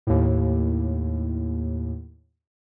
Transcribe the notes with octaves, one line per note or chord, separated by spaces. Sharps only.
D#2 A2